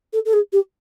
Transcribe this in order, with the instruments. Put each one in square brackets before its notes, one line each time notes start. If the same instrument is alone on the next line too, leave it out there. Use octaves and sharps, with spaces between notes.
[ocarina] A4
A4
G#4
G4